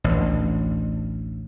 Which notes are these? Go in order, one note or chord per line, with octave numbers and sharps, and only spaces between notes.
A1 D2